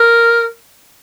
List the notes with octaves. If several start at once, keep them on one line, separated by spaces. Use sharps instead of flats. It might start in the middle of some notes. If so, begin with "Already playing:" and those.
Already playing: A#4